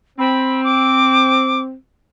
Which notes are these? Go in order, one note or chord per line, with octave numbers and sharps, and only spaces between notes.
C4 B5
D6